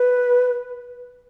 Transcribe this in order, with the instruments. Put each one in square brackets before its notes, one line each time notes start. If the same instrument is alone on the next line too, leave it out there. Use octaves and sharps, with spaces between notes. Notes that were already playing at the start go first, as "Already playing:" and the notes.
Already playing: [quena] B4